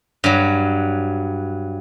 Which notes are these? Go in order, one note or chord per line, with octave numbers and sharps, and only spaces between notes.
G2 F#3